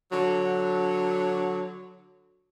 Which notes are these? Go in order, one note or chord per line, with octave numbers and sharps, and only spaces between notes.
D3 F#3